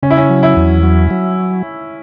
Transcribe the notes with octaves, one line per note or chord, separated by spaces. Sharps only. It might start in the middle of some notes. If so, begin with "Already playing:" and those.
C#3 C#4
E4
C#4
F#3
E4
E2
F#3
F#3